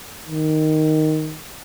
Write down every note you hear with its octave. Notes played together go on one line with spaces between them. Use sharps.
D#3